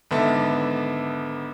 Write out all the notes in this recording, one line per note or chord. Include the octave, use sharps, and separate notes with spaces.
G#1 D3 B3 E5 A5